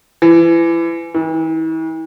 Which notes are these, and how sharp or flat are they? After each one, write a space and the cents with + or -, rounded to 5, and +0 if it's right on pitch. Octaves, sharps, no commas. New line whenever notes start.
E3 +30
E3 -40